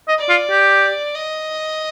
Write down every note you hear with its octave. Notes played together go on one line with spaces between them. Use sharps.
D#5
D5
F4
G4
D#5